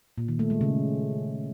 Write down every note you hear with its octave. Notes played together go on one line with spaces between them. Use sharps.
A#2
D#3
A3
G#3
C#3